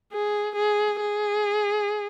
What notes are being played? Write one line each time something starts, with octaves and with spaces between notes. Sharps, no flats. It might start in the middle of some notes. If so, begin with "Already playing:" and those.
G#4
G#4
G#4